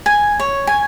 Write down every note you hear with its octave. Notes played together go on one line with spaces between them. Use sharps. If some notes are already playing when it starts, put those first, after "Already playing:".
G#5
C#5
G#5